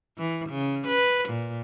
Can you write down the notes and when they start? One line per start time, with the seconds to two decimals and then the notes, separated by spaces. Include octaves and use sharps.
0.18 E3
0.49 C#3
0.87 B4
1.29 A#2